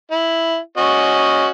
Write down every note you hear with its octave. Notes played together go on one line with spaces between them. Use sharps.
E4
C#4 F#4 D#5